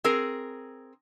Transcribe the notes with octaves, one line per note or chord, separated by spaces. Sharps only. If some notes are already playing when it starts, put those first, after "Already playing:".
C4 G#4 A#4